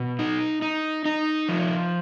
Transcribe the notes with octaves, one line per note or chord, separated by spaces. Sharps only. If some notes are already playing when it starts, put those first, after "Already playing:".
Already playing: B2
D#4
D#4
D#4
F3